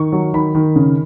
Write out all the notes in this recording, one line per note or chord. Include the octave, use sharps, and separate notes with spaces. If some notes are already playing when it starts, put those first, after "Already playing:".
Already playing: D#3 C#6
F#3
D#3 B5
D#3
C#3